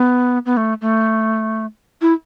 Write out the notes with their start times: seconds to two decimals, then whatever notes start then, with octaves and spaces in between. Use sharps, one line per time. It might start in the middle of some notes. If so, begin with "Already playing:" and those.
Already playing: B3
0.46 B3
0.57 A3
0.81 A3
2.01 E4